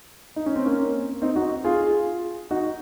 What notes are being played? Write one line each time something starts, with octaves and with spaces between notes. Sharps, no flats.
D#4
C#4
C4
A#3 C#4
C4 D#4
D#4 F#4
F4 G#4
D#4 F#4